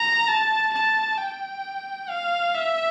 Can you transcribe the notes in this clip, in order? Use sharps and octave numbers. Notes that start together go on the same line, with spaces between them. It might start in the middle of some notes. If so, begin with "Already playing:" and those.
Already playing: A#5
A5
A5
G5
F5
E5